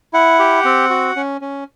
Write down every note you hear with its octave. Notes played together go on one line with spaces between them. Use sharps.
E4 F#5
G4
C4
F#4
C#4
C#4